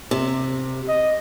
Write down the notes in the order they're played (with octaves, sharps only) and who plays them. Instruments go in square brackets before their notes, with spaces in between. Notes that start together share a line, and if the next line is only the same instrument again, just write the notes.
[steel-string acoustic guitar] C3
[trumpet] D#5